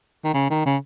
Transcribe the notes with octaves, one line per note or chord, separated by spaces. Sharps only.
D#3
C#3
D#3
C#3